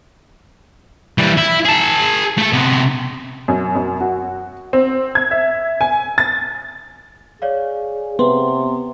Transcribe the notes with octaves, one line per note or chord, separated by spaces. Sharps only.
E3 G3
E4
G#4 A5
A3 A4
C3 B3
F#2
F#2
F#4
C4
G#6
E5
G#5
A6
G#4 C#5 D5 F5
C3 B3 C6